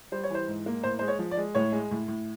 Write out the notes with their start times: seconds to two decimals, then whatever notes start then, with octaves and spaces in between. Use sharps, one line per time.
0.12 G3 C5
0.23 C#5
0.30 E3 C5
0.48 G#2
0.66 A#3
0.83 A2 C5
0.99 G#3 C5
1.08 C#5
1.19 F3
1.31 D5
1.37 G#3
1.55 A2 C#5
1.72 G#3
1.91 A2
2.08 A2